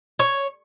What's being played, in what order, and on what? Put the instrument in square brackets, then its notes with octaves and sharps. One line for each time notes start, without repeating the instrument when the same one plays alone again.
[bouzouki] C#5